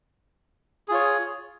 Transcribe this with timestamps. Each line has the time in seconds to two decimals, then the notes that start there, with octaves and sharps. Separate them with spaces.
0.88 G#4
0.91 F4
0.94 C#5